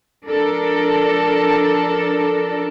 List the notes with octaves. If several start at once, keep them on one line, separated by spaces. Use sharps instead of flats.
F3 D4 A4 A#4